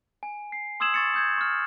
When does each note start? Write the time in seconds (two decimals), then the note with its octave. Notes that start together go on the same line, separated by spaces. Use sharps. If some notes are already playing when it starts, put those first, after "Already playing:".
0.23 G#5
0.52 C7
0.80 C6 D#6 E6 G#6 E7 F#7
0.94 C#6 A6 C#7
1.14 D#6 G6 G#6
1.38 C#6 F6